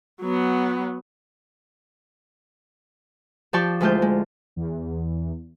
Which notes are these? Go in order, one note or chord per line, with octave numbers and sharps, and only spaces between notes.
F#3 B3
F3 G4 D5 A5 C#6 G6
D2 G#3 E4 F4 C5 G6
G#3
E2